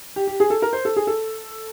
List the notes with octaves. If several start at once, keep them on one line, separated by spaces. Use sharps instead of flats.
G4
G4
G#4
A4
A#4
C5
A4
G#4
A4